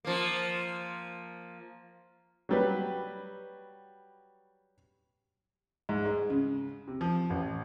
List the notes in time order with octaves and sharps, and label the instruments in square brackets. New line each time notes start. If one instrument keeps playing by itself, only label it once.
[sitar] F3 A#3
[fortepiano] F#3 G3 B4
[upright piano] G#2
G#3
C#3
C3
F3
A1